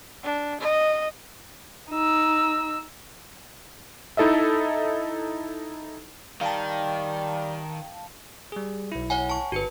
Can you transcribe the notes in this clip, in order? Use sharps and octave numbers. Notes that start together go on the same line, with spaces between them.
D4
D#5
D#4 E6
D#4 E4 A4 D#5 E5
D#3 G3 F5 G5 A5
G3 G#4
B1 E4
C#5 F#5 G#5
A5 C#6
G1 F#4 B4 C#7